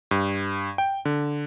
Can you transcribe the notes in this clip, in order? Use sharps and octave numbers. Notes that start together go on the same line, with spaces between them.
G2
G5
D3